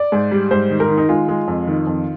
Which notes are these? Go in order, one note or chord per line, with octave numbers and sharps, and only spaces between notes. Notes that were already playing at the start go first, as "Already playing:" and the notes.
Already playing: D5
G#2
G3
G#2 C5
D#3
A#4
D#3
D#4
G#3 F4
G#3
F2
D#3
F2